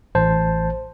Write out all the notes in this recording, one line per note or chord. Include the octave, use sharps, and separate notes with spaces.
A1 C5 A5